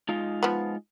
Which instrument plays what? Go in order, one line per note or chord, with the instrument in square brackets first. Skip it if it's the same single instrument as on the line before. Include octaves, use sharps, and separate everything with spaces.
[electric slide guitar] G#3 D#4 F4
[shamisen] F3 B3